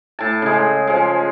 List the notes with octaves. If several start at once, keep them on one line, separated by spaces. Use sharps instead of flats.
A2 A5
C#3 G#3
F3 G#3